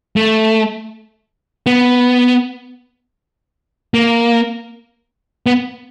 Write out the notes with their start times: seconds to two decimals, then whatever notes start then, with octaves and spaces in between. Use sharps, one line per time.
0.16 A3
1.66 B3
3.94 A#3
5.46 B3